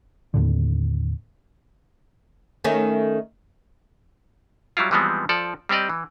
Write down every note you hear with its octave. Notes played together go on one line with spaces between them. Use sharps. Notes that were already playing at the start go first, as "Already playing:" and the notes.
D#2 A2 D3
D#3 A3 C#4
F#3 G3 E4 F4
E3 F3 G3 G#3 B3 C4
F3 A4 D5
G3 C4 G4 D5 D#5
E3